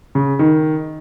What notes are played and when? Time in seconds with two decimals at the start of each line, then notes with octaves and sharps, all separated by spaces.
0.15 C#3
0.39 D#3